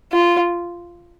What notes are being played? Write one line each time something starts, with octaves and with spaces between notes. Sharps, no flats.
F4